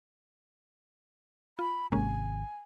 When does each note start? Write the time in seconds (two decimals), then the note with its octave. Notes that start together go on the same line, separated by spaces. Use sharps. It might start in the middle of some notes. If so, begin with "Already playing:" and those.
1.59 F4 B5
1.92 G#1 C3 G#3 A#3 C#4 G#5